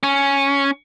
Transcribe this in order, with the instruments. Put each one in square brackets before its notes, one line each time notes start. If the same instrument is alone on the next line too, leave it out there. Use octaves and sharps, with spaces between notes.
[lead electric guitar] C#4